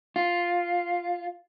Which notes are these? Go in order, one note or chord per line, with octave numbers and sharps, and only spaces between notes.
F4